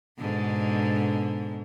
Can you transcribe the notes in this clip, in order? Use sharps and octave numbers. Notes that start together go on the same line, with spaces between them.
G#2 B2 D3